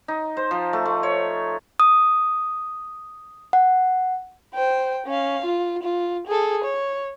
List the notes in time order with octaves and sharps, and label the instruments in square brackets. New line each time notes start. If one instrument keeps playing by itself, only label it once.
[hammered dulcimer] D#4
C5
F3
A3
A3
C#5
[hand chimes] D#6
F#5
[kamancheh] C5 G5
C#4 F5
F4
F4
G#4 A4
C#5